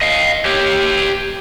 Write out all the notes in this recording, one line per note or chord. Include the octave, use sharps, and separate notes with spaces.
D#5 F5
G4 C#5